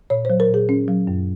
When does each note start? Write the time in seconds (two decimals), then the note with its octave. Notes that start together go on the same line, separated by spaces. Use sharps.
0.10 A#2 C#5
0.25 F#3 C5
0.40 A#4
0.49 A#2 G#4
0.69 D#3 C#4
0.88 F#3
1.07 F#2